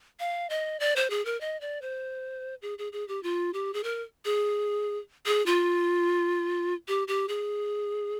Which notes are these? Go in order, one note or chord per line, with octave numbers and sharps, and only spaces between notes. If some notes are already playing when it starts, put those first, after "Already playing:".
F5
D#5
D5
C5
G#4
A#4
D#5
D5
C5
G#4
G#4
G#4
G4
F4
G4
G#4
A#4
G#4
G#4
F4
G4
G4
G#4